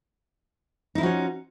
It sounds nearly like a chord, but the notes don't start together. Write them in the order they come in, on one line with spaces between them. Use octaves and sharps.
D#4 E4 F3 F#4 C#4